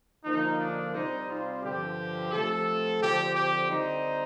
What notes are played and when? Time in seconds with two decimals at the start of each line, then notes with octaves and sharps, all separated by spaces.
0.24 D3 F3 A#3 D#4
0.59 D4
0.93 C3 G3 C4 D#4
1.28 F4
1.62 G2 D3 F3 G4
2.31 C3 F3 A3 A4
3.00 D3 F3 C4 G4
3.35 G4
3.69 D3 G3 C4 D#4